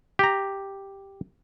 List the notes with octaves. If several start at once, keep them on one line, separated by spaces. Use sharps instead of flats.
G4 A#5